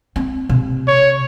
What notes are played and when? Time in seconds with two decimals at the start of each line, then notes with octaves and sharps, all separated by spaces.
0.16 C4
0.49 C3
0.88 C#5